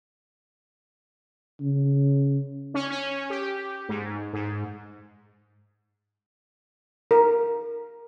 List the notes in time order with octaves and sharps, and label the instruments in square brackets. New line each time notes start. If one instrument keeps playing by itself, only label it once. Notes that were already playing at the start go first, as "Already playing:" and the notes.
[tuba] C#3
[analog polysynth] C#4
C#4
G4
G#2
G#2
[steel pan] A#4